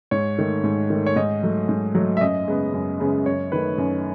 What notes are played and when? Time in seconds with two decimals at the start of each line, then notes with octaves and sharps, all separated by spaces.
0.11 G#2 C#5
0.38 D#3 A3
0.64 G#2
0.90 D#3 A3
1.06 C#5
1.16 G#2 D#5
1.43 F#3 A3
1.69 G#2
1.95 F#3 A3
2.17 E5
2.21 F#2 D#5
2.47 C#3 G#3 B3
2.73 F#2
3.00 C#3 G#3 B3
3.26 F#2 C#5
3.52 D#3 A3 B4
3.78 F#2